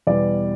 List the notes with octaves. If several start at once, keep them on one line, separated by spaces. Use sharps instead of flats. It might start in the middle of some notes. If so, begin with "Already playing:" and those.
E2 B2 G3 D5